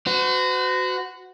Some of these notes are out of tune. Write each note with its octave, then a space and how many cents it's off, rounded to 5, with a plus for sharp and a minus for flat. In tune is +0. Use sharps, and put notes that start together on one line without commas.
F#4 +0 C5 -45